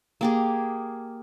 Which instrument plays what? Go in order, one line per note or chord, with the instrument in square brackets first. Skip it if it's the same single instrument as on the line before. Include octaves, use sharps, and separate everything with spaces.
[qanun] A#3 G4 G#4